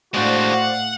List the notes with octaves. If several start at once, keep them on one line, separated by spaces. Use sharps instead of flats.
A2 G#3 D4 F#4 C5 D5 F5
F#5